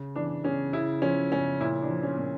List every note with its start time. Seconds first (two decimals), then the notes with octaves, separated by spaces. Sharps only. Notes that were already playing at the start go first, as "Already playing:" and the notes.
Already playing: C#3
0.16 E3 D4
0.44 C#3 C#4
0.73 C#3 E4
1.02 F3 C#4
1.32 C#3 C#4
1.60 A#2 E4
1.82 D4
1.89 F3
2.03 C#4
2.18 A#2